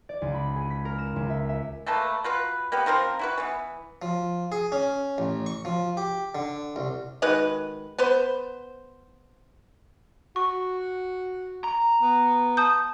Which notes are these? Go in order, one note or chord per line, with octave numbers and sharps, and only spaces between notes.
D5
C#2
B5
G#4
B6
A#4
E7
C#2
E5
E5
A3 A#3 B4 A5
F#3 F4 B4
A#3 B3 G4 B4
F3 C4 F4 A#4
E4 F#4 B4
E3 B3
F3
G#4
C#4
A1
C#6
F3
G4
D3
C2
D#3 G#3 F#4 B4
B3 B4 C5
F#4 C#6
A#5
B3
A5 D#6 G6